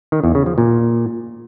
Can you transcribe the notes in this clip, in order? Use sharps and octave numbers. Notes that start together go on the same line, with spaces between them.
D#3
E2
C#3
F3
A#2